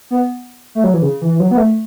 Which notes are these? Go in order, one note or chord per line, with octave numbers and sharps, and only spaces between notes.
B3
A3
F#3
E3
C#3
E3
E3
F#3
B3
A3